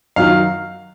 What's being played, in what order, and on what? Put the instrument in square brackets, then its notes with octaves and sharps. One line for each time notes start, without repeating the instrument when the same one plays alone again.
[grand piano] F#2 D#3 F#3 F5